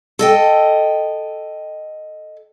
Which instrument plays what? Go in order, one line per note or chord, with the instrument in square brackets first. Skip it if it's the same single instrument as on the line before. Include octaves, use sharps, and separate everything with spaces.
[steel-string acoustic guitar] A4 D#5 G5